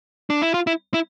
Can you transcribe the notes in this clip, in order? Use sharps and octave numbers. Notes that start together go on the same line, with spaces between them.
D4
E4
F4
E4
E4